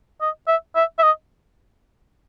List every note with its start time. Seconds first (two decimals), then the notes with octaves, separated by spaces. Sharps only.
0.21 D#5
0.47 E5
0.76 E5
0.98 E5
1.02 D#5